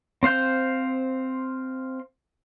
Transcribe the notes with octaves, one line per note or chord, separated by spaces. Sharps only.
C4 C5 F5 G6